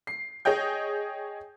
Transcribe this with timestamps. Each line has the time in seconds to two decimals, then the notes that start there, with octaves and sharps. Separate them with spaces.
0.07 C7
0.45 G#4 C#5 D#5 G5 G6